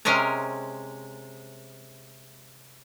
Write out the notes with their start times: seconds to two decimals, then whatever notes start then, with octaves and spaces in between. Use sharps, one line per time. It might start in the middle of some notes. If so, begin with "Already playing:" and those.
0.05 C3 G#3 C#4 A#4 A#5